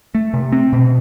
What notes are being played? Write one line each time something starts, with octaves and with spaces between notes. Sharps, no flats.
A3
C3
C4
B2